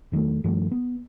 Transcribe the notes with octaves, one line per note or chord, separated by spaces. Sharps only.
E2 D#3 F#3 A3
G2 D#3 F3 A3
B3